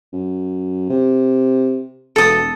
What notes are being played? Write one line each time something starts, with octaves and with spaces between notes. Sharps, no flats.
F#2
C3
E1 A4 D#6